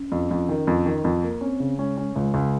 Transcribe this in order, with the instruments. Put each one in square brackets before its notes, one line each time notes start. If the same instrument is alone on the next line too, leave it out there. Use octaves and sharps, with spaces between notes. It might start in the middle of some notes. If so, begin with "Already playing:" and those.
Already playing: [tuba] C#4
[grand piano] F2
F2
D#3
F2
D#3
F2
A#3
[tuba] C4 [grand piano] C#4
[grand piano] C#3
[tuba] G#3 [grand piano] C#4
[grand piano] C#4
[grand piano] C#2 [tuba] G#3
[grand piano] C#2